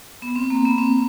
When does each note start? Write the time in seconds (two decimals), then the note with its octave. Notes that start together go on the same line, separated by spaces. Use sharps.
0.22 B3
0.36 C4
0.50 A#3
0.65 B3
0.78 C4